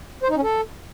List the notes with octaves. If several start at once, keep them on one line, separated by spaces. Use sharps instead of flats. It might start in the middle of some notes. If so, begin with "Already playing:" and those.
C5
D#4
C#4
A4